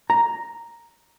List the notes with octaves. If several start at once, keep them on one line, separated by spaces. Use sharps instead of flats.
A#5